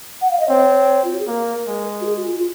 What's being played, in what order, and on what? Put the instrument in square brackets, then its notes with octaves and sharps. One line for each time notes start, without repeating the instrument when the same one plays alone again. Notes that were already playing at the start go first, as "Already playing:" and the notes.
[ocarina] F#5
F5
D#5
[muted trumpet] C4 [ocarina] C#5
[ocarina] F4
F#4
G#4
[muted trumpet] A#3 [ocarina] A#4
[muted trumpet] G#3
[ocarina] F#4
G#4
F#4
F4
F4